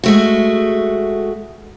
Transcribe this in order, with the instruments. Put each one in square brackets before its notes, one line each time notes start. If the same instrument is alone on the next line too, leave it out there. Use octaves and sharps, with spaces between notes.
[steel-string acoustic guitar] G#3 A3 F#4